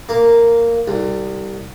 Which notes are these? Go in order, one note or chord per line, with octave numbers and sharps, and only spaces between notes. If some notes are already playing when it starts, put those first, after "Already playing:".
A#3
C2